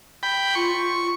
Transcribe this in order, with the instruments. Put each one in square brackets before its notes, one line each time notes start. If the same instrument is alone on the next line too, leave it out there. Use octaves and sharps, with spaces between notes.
[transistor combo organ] G5 B5
[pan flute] F4 [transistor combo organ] C#6